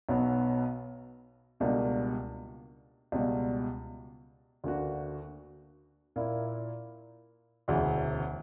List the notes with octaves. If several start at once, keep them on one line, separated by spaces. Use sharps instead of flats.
B1 B2 F#3 B3
C#2 B2 G3 A#3 D4
C#2 B2 G3
D2 D3 A#3 D4 F#4
A#2 A#3 E4
E1 D2 C#3 E3